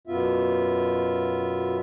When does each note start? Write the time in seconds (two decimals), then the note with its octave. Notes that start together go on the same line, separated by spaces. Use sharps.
0.07 F#2 B2 B3 F4 E5